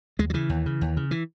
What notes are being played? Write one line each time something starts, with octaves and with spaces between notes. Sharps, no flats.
D#2 G#3
F#3
C#3 E3
D#2
C#3
D#2
C#3
E3